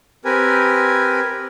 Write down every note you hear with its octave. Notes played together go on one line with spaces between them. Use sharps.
C4 G4 A#4 B4 G#5